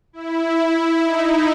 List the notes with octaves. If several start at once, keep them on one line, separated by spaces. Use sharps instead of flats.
E4
D#4